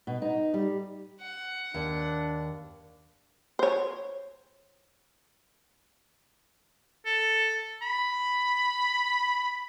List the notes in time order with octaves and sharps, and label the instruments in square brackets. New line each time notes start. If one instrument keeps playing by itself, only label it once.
[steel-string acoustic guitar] B2
D#4
G3
[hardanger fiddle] F#5
[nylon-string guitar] D#2 [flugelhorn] D4
[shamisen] C5 C#5
[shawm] A4
B5